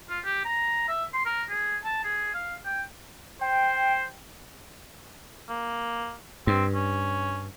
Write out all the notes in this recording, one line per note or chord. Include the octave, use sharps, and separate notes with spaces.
F4
G4
A#5
E5
C6
A#4
G#4
A5
G#4
F5
G5
C5 G5
A#3
G2 C4
C#4